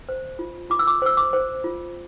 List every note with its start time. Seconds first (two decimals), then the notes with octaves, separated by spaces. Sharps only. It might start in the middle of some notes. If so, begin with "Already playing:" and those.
0.09 C5
0.39 F4
0.70 F4 D6
0.79 E6
0.87 D6
1.02 C5 E6
1.17 D6
1.33 C5
1.64 F4